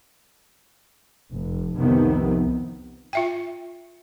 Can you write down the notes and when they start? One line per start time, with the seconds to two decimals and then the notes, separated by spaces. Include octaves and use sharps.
1.33 F1
1.78 C2 F2 C3 D#3 F3 B3
3.13 F4 E5 G5